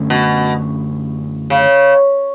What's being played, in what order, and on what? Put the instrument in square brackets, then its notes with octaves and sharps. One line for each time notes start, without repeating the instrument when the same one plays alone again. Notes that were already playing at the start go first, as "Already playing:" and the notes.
Already playing: [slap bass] F#2 D3 A3 C#4
[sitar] B2
C#3